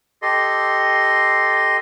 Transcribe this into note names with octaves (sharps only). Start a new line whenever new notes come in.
G4 A4 D#5 C6